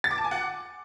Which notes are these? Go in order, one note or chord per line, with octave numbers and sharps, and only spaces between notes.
A6
D6
A5
G#5
F#5